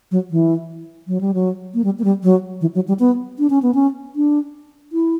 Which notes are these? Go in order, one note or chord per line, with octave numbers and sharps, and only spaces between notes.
F#3
E3
F#3
G3
F#3
A#3
G3
A#3
G3
F#3
E3
F#3
G3
B3
D4
C#4
B3
C#4
D4
E4